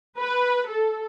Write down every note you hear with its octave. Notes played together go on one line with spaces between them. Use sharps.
B4
A4